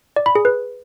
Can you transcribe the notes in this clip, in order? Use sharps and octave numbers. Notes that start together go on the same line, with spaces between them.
D5
B5
G#4
B4